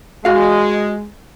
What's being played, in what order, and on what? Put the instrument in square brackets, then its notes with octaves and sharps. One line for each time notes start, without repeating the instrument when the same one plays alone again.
[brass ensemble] G#3 [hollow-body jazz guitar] F#4 F5